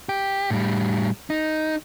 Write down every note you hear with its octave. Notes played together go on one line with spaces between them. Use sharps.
G4
A2 G3
D#4